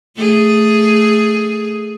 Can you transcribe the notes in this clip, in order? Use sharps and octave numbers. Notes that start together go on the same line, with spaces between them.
A3 G#4